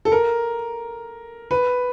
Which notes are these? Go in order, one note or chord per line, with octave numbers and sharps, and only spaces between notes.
A4
A#4
B4